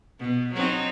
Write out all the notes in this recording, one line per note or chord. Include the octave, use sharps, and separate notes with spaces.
B2
F#3 C4 D#4